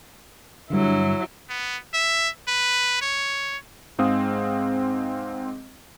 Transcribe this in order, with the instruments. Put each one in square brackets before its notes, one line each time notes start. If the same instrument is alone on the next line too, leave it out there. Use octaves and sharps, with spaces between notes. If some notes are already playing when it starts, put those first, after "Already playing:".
[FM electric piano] G2 D3 [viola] F#3 E4
[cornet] B3
E5
B4
C#5
[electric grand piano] G#2 G#3 C4 F5 D#6